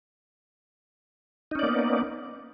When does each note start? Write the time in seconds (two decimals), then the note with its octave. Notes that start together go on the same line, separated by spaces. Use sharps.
1.51 D#4
1.55 C#4
1.59 D5
1.63 A#3
1.67 B3